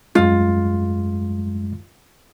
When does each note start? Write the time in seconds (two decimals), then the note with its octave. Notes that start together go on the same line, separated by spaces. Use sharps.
0.15 F#2 G#3 F4